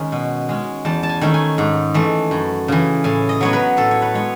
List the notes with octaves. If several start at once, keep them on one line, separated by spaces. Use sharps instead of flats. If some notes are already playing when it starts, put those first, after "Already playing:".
Already playing: D#3 G#3 C#4
B2
G#3 C#4
E2 A5
A5
G#5
D#3 A3 C#4
G#5
G#2
E3 A3
F#2
C#3 E3
A2 G#5
D#5
F#3 B3 C#5
B4
A2 A4
C#5
B4
G#3 B3 C#5